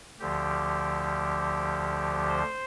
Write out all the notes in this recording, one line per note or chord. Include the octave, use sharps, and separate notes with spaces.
D2 D3 F3 G4
C5